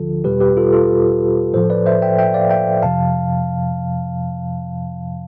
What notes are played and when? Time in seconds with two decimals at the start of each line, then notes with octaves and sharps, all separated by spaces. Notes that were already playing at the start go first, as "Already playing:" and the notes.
Already playing: D2 D3 F3 F4 A4
0.24 E2 B2 G3 G4 B4
0.40 G4 B4
0.57 F4 A4
0.73 F4 A4
1.53 A2 F3 A4 C5
1.70 B4 D5
1.86 C5 E5
2.02 E5 G5
2.18 E5 G5
2.34 D5 F5
2.50 E5 G5
2.82 F2 C3 F3 F5 A5